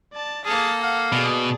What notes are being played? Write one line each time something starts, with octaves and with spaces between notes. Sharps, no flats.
D5 A5
A#3 G#4 A4 A5 F6
F5 F#5
B2 G#4 D5